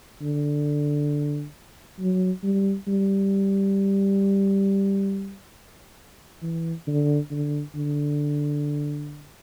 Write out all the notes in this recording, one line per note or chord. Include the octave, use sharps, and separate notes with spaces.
D3
F#3
G3
G3
E3
D3
D3
D3